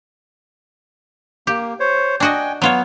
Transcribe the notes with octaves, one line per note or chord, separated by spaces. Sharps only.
A#3 G4
C5 C#5
D4 F#4 D#5 G5 G#5
F#3 B3 F4 C#5